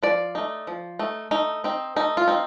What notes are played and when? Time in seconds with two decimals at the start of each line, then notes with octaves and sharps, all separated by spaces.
0.03 F3 D5
0.35 A3 D#4
0.67 F3
0.99 A3 D#4
1.31 A3 D#4
1.64 C4 D#4
1.96 A3 D#4
2.17 F4
2.28 C4 D#4